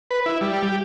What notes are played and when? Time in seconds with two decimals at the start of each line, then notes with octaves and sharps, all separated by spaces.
0.11 B4
0.26 E4
0.41 G3
0.63 G4